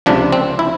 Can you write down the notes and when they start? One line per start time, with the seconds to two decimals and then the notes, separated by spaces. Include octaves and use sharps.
0.06 C#2 C3 F3 D4
0.33 C4
0.59 E4